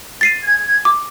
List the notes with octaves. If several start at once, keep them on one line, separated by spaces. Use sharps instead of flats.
A6 C7 D#7
G#6
D6